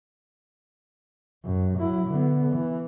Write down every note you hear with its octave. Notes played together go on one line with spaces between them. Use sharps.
F#2
F#3 E4
D3 B3
E3